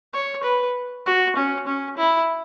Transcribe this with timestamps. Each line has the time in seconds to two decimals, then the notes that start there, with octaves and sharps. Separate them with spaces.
0.13 C#5
0.44 B4
1.06 F#4
1.36 C#4
1.67 C#4
1.97 E4